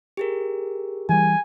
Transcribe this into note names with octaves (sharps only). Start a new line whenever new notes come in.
G4 G#4 A#4
E3 G3 G#5